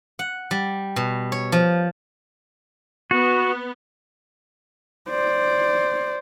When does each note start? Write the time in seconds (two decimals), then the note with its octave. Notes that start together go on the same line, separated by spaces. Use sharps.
0.19 F#5
0.51 G3
0.96 B2
1.32 C#5
1.52 F3
3.11 B3 F#4
5.09 C5 D5